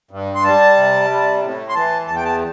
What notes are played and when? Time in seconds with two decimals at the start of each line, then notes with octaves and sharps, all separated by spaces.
0.11 G2
0.35 C6
0.44 G3 A5
0.77 C3
1.10 G3
1.42 A2
1.69 C6
1.75 E3 A5
2.07 E2 A5
2.16 G5
2.25 A5